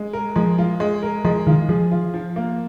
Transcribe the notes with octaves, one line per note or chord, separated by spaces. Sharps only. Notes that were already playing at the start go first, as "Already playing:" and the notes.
Already playing: G#3
A#4
F3 G#3
F4
G#3
A#4
F3 G#3
D#3 F4
F3 G#4
F4
F3
A#3